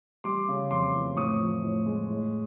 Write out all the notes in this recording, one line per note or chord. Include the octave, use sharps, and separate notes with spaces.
G3 C6 D6
C#3
F2 C6 D6
E3
A2 C#6 D#6
F3
A2
G#3
A2